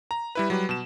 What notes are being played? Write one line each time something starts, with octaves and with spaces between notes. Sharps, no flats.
A#5
G3 E4 B4
F#3 G3 B4
B2 E7